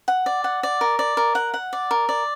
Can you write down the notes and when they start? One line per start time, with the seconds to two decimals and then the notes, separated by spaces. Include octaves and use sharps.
0.08 F#5
0.26 D5
0.44 F#5
0.63 D5
0.81 A#4
0.99 D5
1.17 A#4
1.35 F#5
1.54 F#5
1.73 D5
1.91 A#4
2.09 D5